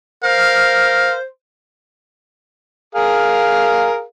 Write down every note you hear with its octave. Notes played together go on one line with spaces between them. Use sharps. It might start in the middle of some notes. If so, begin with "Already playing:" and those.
A#4 C5 F5
G#4 A#4 F5